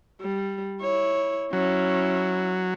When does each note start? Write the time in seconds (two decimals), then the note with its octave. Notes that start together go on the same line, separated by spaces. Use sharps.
0.21 G3
0.81 E4 C#5
1.53 F#3 C#4 E4